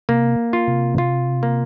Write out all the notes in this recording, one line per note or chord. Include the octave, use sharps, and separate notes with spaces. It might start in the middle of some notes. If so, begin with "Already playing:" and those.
C3 A#3
F4
C3
F4
A#3